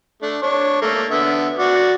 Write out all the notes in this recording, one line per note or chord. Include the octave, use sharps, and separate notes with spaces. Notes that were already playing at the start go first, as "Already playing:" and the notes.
A3 D4
D4 C#5
A3 A#3
D3 B3 E5
F#4 D5